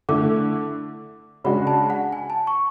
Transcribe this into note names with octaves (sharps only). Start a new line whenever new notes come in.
D3 A3 E4 D6
C#3 G#3 D4 F#4 B5
A5
F#5
G#5
A5
C#6